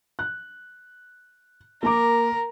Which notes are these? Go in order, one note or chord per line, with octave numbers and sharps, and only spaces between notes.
F#6
A#3 A#4 A#5 D6